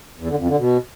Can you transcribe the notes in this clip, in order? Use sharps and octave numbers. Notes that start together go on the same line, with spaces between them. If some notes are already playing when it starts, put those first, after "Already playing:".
E2
D3
F2
D3
B2